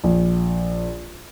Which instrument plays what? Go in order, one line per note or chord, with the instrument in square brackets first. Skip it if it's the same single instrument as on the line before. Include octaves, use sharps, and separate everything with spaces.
[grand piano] A#1